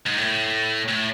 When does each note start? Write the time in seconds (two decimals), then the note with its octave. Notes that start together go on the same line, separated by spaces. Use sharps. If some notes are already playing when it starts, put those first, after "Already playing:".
0.07 G#2
0.18 A2
0.89 A2